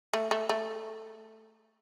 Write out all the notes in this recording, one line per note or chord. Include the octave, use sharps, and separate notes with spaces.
A3
A3
A3